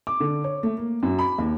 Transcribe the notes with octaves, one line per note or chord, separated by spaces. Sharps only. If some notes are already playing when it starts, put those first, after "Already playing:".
D6
D3
C#5
A3
A#3
F#2
B5
D#2